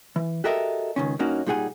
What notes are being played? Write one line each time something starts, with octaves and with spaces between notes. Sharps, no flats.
E3
F#4 G4 A4 A#4 D#5 E5
C#2 D#3 C#4
G2 A#3 C#4 D#4 F#4
A#2 G3 D#4 G#4 F#5 G#5